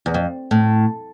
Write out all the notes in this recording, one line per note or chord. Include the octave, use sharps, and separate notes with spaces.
E2
F2
A2